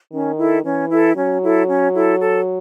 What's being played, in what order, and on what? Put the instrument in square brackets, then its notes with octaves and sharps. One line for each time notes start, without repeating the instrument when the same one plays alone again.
[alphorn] D#3 [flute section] C#4
[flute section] E4 A4
[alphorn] E3 [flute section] C#4
[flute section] E4 A4
[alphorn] F#3 [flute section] C#4
[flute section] E4 A4
C#4
E4 A4
A4